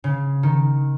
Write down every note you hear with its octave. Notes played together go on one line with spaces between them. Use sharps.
C#3
D#3